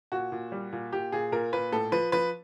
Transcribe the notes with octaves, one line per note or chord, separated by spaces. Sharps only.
A#2 F#4
A#2
G3
A#2
A#2 G4
A#2 G#4
A#2 A#4
A#2 B4
A2 A4
F3 B4
F3 B4